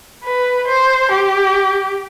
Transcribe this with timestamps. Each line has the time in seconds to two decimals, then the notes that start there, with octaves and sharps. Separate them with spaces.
0.25 B4
0.67 C5
1.11 G4